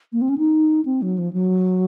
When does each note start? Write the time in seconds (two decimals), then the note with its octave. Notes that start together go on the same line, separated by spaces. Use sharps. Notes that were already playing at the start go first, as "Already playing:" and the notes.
0.12 A#3
0.21 C4
0.29 C#4
0.38 D#4
0.85 C4
1.02 F#3
1.18 F3
1.33 F#3